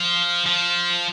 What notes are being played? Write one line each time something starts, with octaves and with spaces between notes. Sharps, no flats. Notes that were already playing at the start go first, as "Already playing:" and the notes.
Already playing: F3
F3